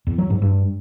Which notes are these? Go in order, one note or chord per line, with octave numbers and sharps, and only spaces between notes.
E2
F#3
G#2
G2